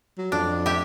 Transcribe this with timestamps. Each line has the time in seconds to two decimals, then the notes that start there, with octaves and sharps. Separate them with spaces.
0.18 F#3
0.32 F2 D4
0.66 G4 E5